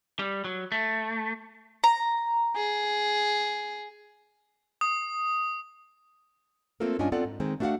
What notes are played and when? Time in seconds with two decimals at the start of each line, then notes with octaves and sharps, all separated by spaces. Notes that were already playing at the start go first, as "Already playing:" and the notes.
0.19 G3
0.44 F#3
0.72 A3
1.84 A#5
2.55 G#4
4.81 D#6
6.80 A3 A#3 C4 F4 A4 A#4
6.99 G2 C#4 D4 F4 D#5 G#5
7.12 B3 C4 F4 A4 D5 F#5
7.25 G#2
7.40 D#3 G#3 C4
7.60 A3 D4 F#4 A#4 F5 F#5